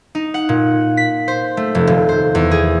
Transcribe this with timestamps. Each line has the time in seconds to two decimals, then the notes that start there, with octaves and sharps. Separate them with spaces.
0.15 D#4
0.34 F#5
0.49 A#2
0.97 B6
1.28 C5
1.57 A3
1.75 F1
1.87 D#1
2.09 C5
2.35 E2
2.51 G#4